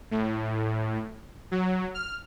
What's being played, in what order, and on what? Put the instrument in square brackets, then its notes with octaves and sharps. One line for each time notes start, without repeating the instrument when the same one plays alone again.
[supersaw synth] A2
F#3
F6